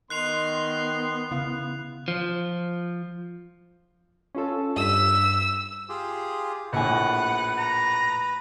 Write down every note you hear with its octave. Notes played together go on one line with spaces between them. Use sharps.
D#3 B3 C6 F#6 C7 F7
C#3 E4 F5
F3
C#4 F4 A4
G2 E6 B6
F4 G4 G#4
A#1 A2 B4 F#5 G#5
A#5